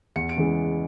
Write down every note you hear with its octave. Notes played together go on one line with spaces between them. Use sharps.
E2 C#7
D7
C#3 E3 G#3